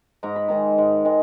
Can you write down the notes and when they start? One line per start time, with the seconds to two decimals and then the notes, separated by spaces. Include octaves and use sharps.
0.23 G#2 A#5
0.36 B5
0.48 D#3 G#3 A#5
0.78 G#2
1.05 D#3 G#3